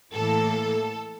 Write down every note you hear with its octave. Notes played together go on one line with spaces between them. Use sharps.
A2 E3 A#3 A4